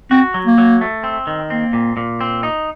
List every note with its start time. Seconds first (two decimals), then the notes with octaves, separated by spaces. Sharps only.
0.11 C4 F#4
0.34 F#3
0.47 A#3
0.58 F#3
0.81 A3
1.03 C4
1.27 D#3
1.50 A#3 C4
1.73 A#2
1.97 A#2
2.21 C4
2.43 D#4